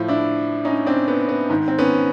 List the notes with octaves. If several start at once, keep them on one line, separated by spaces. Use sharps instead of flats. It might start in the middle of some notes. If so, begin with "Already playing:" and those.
Already playing: A2 F3
D4 E4
C#4 D#4
C4 D4
B3
B3
G#2 D#3
C4
B3 C#4